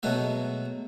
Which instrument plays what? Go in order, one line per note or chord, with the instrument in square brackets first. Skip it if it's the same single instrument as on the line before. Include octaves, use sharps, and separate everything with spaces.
[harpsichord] B2 F#3 G#3 A3 F#4